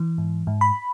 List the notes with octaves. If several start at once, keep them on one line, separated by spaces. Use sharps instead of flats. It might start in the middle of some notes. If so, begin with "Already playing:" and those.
Already playing: E3
G#2
G#2
B5